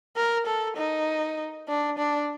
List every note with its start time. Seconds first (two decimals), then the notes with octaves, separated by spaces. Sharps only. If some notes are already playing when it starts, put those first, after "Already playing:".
0.16 A#4
0.46 A4
0.77 D#4
1.68 D4
1.99 D4